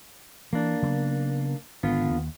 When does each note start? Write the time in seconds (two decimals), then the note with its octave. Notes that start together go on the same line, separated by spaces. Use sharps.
0.53 E3 A#3 D4
0.82 C#3 F#3 B3
1.83 G#1 D3 B3 F4
2.10 D#2